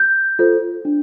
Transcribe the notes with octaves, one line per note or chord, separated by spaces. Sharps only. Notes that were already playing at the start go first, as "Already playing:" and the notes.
Already playing: G6
F4 A4 C5
D4